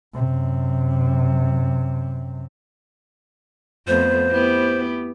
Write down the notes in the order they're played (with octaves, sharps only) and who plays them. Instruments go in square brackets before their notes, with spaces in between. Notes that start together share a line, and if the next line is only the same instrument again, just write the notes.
[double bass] F#2 C3
[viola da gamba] F2 A3 B3 [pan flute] C5
[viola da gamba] B3 E4 G4